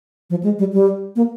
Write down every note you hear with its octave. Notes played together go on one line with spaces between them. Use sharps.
F3
G#3
G3
G3
A#3